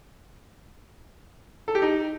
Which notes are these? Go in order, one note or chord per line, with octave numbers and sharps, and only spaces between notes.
A4
G4
D#4